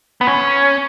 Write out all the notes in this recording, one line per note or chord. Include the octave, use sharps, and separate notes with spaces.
B3
C#4